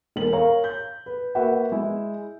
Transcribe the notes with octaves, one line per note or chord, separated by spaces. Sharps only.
E1 A#4 F#7
A#4 C#5 F5 A#5
G6
B4
A#3 F#4 B4 E5 F#5
G#3 E4